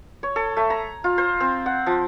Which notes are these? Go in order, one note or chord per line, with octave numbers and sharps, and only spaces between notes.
C#5
A4
A3
A#5
F4
C5
C4
F#5
F3